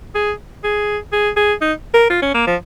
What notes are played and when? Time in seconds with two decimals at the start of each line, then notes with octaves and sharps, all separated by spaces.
0.15 G#4
0.64 G#4
1.13 G#4
1.37 G#4
1.61 D#4
1.94 A#4
2.10 F4
2.22 C#4
2.34 A#3
2.47 F3